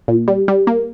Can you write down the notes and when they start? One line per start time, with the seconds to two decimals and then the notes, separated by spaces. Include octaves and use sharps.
0.08 A#2
0.28 G3
0.48 G3
0.67 A#3